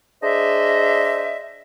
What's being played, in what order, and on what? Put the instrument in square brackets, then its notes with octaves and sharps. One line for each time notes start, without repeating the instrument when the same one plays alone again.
[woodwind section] D4 G#4 C5 D#5 E5